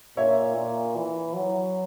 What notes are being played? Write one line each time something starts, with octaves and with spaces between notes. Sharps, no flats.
A#2 C#5 E5
A#2
E3
F#3